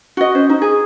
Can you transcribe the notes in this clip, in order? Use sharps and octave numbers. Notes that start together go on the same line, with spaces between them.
F#4 D#5
C#4 C5
D#4
G#4